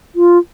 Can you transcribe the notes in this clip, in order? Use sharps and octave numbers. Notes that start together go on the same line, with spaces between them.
F4